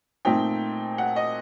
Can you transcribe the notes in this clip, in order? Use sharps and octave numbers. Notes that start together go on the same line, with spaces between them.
A#2 A3 C4 D#4 G5
F#5
D#5